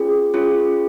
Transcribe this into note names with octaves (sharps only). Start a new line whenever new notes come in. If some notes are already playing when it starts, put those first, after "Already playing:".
Already playing: C#4 F4 G#4
C#4 F4 G#4